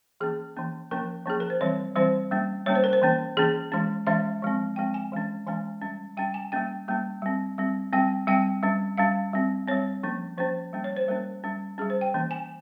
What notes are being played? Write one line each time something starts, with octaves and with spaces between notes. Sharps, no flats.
E3 A#3 C#4 G#4
E3 A#3 C#4
F3 A#3 C#4 A#4
F3 A#3 C#4 G#4
A#4
C5
E3 G3 C4 C#5
E3 G3 C4 C5
G3 A#3 C#4
G3 A#3 C#4 C#5
C5
A#4
C5
E3 A#3 C#4
E3 A#3 C#4 G#4
E3 G#3 C#4
E3 G#3 C#4 E5
F3 G#3 C4
F3 G#3 C4 G5
G#5
E3 G#3 C#4
E3 G#3 C#4 G#5
G3 C#4
G3 C#4 G5
G#5
G3 A#3 C#4 G5
G3 A#3 C#4
G3 C4
G3 C4
G3 C4 G5
G3 C4 G5
G3 C#4
G3 C#4 F5
G3 C4
G3 C4 C#5
F3 A#3 C#4
F3 A#3 C#4 C5
G3 A#3 C#4
C#5
C5
G3 A#3 C#4 A#4
G3 C#4
G3 C#4 G#4
C5
G5
E3 A#3 C#4
G#5